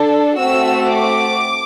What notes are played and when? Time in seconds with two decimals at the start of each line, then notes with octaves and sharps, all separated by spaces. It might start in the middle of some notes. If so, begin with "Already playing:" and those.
Already playing: D4 A4
0.38 A3 C4 F#4 E6
0.87 D6